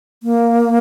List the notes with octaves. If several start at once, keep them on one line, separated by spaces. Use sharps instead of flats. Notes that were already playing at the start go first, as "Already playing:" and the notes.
A#3